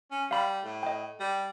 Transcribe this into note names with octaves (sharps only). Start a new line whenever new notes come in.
C#4
G3 F5 B5
A2
D#5 G5
G3